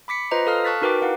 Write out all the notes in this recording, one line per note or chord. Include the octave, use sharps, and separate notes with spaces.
B5 D6 B6 C#7
F4 B4 C5 D#5 A#5
A4 F5 D#6 F6
A5 C#6 F#6 A6 B6
D#4 F#4 A#4 B4 G5 D6
E4 F5 F#5